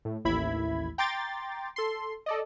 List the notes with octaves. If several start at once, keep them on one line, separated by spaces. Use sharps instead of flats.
A2
A1 D#2 E4 B5 G#6
G5 A#5 C6 D6 G6 A6
A4 C6
A4 D5 D#5